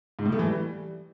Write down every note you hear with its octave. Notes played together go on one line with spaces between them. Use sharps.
G#2
A2
A3
E3
G3